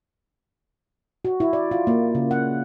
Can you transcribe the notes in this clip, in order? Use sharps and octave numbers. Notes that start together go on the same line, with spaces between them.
F#4
E4
D5
F4
A#3
C#3
F#5